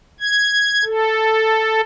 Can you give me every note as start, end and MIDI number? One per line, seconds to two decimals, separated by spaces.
0.20 0.84 92
0.85 1.81 69